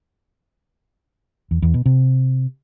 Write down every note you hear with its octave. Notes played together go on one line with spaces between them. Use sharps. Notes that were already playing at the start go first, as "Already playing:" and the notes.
E2
E2
B2
C3